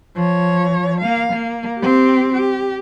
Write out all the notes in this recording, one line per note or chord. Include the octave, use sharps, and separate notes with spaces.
F3 C#5
A#3 F5
A#3
C4 G4
G4